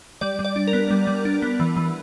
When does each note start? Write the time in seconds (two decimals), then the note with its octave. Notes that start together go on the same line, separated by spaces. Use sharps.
0.21 G3 D5
0.39 G3
0.45 D5
0.56 D4
0.67 A#4
0.73 B3
0.91 G3
1.07 G3
1.25 D4
1.42 B3
1.60 E3
1.76 E3